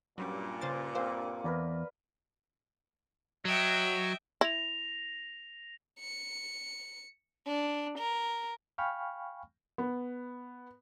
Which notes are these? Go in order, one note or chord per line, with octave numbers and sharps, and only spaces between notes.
G2 A#2 F#3 G3 C#4
C#3 C5 A6
A#3 C4 C5
E2 A#4 B4 D5
F#3 D#5 E5 G5
E4 A#6 F7
C#7
D4
A#4
F5 G5 G#5 B5 C#6 F6
B3